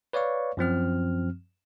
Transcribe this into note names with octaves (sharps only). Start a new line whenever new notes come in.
B4 C#5 D5 F5 C#6
F#2 F3 C4 F6